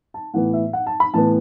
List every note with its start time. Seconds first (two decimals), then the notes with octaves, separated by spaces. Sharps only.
0.14 A5
0.34 A2 E3 B3 F#5
0.53 E5
0.73 F#5
0.87 A5
1.00 B5
1.14 A2 E3 B3 A5